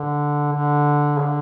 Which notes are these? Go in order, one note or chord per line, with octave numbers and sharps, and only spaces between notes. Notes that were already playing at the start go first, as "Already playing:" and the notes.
Already playing: D3
D3
C#3
D3